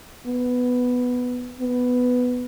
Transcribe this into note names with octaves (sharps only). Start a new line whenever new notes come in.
B3
B3